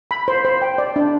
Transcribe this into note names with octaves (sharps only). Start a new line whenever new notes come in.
B5
C5
C5
G5
D5
D4